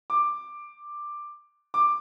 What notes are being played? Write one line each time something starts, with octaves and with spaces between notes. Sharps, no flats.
D6
D6